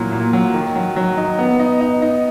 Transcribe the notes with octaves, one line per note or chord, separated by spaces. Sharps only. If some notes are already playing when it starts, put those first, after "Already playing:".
Already playing: A#2 E3 F#3
A#2
F#3
D#3
F#3
F#3
D#4
B3
D#4
D#4
D#4